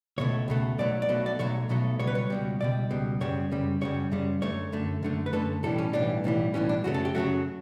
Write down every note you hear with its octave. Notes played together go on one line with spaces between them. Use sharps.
C#2 B2 A3 C#5
C#2 B2 A3
B1 B2 F#3 A3 D5
D5
B1 B2 F#3 A3
D5
B1 B2 F#3 A3 C#5
B1 B2 F#3 A3
C#2 B2 G3 C#5
B4
C#5
C#2 B2 G3
C#2 B2 G3 D5
C#2 B2 G3
F#2 C#3 G3 C#5
F#2 C#3 G3
F#2 C#3 G3 C#5
F#2 C#3 G3
F#2 D3 A3 C#5
F#2 D3 A3
F#2 D3 A3
B4
F#2 D3 A3 A4
B1 A2 E3 G3 A4
C#4
B1 A2 E3 G3 D4
B1 A2 E3 G3
B1 A2 E3 G3 C#4
D4
F#2 C#3 F#3 A3 F#4
A4
G4
F#2 C#3 F#3 A3 F#4